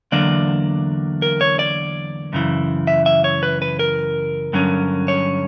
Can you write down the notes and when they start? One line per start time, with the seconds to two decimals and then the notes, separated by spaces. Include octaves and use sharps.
0.12 E2 D3 F#3 A#3 D4 D5
1.22 A#4
1.41 C#5
1.59 D5
2.33 F#2 C#3 E3
2.87 E5
3.06 E5
3.24 C#5
3.43 B4
3.62 B4
3.79 A#4
4.53 G2 D3 F#3 C#4
5.08 C#5